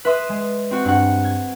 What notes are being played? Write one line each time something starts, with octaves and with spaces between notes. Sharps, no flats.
B4 E5 C6 D#6
G#3
C4 F#4
G2 F#5
G#6